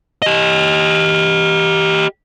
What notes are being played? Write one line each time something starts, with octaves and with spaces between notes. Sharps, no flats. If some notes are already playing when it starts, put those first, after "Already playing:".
G4 D#5